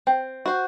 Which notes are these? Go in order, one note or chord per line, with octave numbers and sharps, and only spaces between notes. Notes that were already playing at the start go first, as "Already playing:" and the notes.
C4
F#4 C5